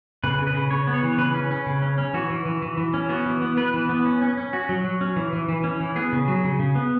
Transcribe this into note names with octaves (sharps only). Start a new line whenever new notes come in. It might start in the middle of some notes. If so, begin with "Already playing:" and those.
C#3 B4
C#3
B4
C#3
C#3 C#5
B3
C#5
E3
C#3 B4
C#4
C#4
C#3
C#4
C#4
E3 F#4
E3
E3
E3
E3
C#4
B3 F#4
E3
B3
B3 B4
E3
B3
C#4
C#4
C#4
C#4 F#4
F#3
F#3
C#4
E3
E3
E3
C#4
E3
B3 G#4
C#3
F#3
C#3
C#3
B3